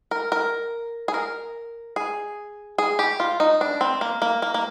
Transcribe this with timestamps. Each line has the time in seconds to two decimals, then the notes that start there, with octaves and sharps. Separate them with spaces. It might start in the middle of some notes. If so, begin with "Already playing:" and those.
0.11 A#4
0.32 A#4
1.08 G#4
1.14 A#4
1.96 G#4
2.78 G#4
2.99 G4
3.20 F4
3.40 D#4
3.61 D4
3.81 C4
4.01 A#3
4.22 A#3
4.42 A#3
4.54 A#3